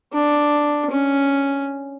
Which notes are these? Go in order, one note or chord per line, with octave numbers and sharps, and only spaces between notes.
D4
C#4